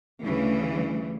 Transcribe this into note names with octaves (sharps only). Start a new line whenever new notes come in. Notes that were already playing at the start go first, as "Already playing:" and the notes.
D2 C#3 E3 G3 A3